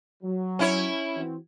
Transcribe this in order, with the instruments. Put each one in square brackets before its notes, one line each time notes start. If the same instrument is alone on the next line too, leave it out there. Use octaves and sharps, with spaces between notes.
[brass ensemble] F#3
[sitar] C#4 E4 C#5
[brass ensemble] E3 C4 F#4